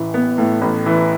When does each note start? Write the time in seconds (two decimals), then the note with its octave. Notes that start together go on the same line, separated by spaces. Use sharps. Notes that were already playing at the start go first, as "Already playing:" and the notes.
Already playing: A1 E3
0.14 B3
0.38 A2
0.61 A1
0.86 E3